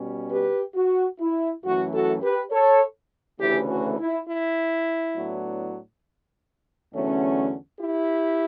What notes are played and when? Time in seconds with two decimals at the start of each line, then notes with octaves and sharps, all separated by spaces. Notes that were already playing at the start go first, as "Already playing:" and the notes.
Already playing: B2 G3 C#4
0.31 G4 B4
0.75 F#4
1.20 E4
1.63 F#2 E3 A3 C#4 F#4
1.92 F#4 A4
2.22 G4 B4
2.51 A4 C#5
3.39 D2 C#3 E3 A3 C#4 E4 G4
3.69 F#4
3.98 E4
4.27 E4
5.15 A2 F#3 B3 D4
6.92 E2 D3 F#3 A3 C#4
7.80 E4 G4